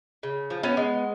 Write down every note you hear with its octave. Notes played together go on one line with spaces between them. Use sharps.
C#3
F3
B3 C#4
G#3